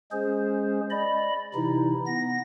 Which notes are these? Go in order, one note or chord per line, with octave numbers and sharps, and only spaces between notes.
G#3 C#4 G#4 C5
D5 D#5 B5
C3 E3 D#4 E4
B3 A#6